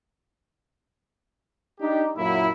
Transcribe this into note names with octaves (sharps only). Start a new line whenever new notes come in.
D4 D#4 G4
F#2 A#2 F#3 A#3 E4